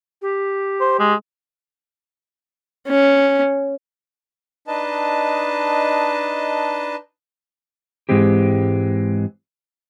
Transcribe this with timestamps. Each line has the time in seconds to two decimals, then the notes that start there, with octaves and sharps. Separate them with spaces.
0.21 G4
0.80 C5
0.99 G#3
2.88 C#4
4.67 D4 D#4 B4 D#5 A5
8.09 G#2 B2 E3 G#3 C4 G4